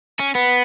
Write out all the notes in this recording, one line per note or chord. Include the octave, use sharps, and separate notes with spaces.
C#4
B3